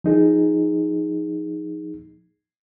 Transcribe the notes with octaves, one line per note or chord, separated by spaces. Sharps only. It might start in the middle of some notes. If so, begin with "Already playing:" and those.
F3 D#4 G#4